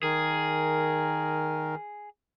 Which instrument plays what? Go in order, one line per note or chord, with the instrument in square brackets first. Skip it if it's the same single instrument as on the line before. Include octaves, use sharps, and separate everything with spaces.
[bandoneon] D#3 A#4 [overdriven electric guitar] G#4